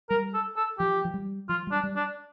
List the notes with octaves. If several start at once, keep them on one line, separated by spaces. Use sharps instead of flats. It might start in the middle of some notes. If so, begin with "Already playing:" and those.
G3 A#4
A4
A4
F3 G4
F3
G3
F3 F4
G3 D4
G3
D4